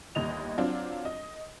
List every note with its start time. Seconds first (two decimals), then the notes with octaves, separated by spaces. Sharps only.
0.15 G1 D#2 D#5 F7
0.58 F#3 C4 D4 F4
1.05 D#5